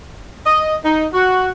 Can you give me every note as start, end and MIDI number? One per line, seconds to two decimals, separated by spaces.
0.46 0.75 75
0.84 1.06 63
1.14 1.49 66